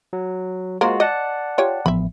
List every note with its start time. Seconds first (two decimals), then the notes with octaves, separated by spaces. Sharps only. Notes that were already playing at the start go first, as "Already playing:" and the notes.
0.13 F#3
0.81 G#3 A#3 F4 F#4 A#4 C5
1.00 D5 D#5 F#5 A5
1.58 F4 G4 C#5
1.86 A1 F3 B3 E5 B5